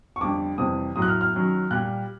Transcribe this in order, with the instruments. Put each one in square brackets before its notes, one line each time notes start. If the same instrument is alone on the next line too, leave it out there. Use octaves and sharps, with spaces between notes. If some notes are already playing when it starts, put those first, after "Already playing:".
[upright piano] C#6
F2 D3 G3 D6
F2 C3 E3 G3 D#6
A2 F#3 D#6
F#6
F6
F6
F#2 D#3 F#3
A#2 G3 F#6